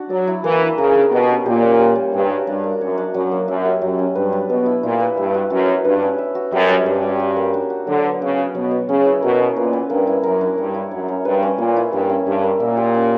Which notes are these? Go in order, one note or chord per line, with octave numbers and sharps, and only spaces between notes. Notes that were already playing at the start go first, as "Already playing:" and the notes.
Already playing: D4 F#4
F#3 D5
E4
E3 A#3
D4
C#3 A#4
D4
B2 G4
C#4
A#2 G4
C#4
G3
A#3
G2 C#4
F#4
G2 D4
A#4
F#2 C#5
D4
F#2 F#3
A#3
F#2 E5
G4
F#2 F#3
C#4
G2 B4
D4
B2 B3
E4
A#2 E4
B4
G2 E5
F#4
F#2 F#4
B3
G2 B4
C#4
E5
F#4
F#2 G3
C#4
G2 D5
F#4
G4
A#3
D4
F#4
D3 F#3
B3
C#3 B3
F#4
B2 F#3
B3
C#3 C#4
E4
B2 A#4
C#4
A#2 B4
B3
G2 A#3
E4
F#2 A#4
D4
G2 C#5
E4
F#2 C#5
C#4
G2 B4
C#4
A#2 A#3
E4
G2 A#3
C#4
G2 E5
A#4
A#2 E5
G4
C#4